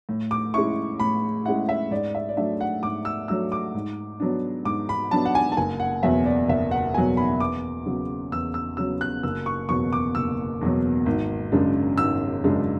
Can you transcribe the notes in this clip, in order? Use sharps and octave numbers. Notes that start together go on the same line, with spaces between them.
A2
D6
G#3 C#4 E4 C#6
A2 B5
G#3 C#4 E4 F#5
E5
G#2 D5
E5
D5
F#3 A3 D4 E5
F#5
G#2 D6
E6
F#3 A3 D4 E6
D6
G#2
F#3 B3 D4
G#2 D6
B5
F#3 B3 D4 A5
F#5
G#5
A5
F#1 G#5
F#5
E2 B2 F#3 E5
D5
F#1 E5
F#5
E2 B2 F#3 G#5
B5
E2 D6
C#3 F#3 B3
E2 E6
E6
C#3 F#3 B3 E6
F#6
F#1 E6
C#6
E2 B2 F#3 C#6
D6
F#1 E6
E2 B2 F#3
G#1
F#2 C#3 G#3 D4
G#1 E6
F#2 C#3 G#3 D4